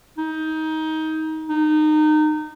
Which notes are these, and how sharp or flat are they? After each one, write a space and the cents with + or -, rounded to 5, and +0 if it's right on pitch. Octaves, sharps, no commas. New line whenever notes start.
D#4 +20
D#4 -25